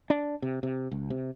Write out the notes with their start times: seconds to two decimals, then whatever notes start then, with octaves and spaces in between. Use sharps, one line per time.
0.10 D4
0.42 C3
0.63 C3
0.91 C#2
1.10 C3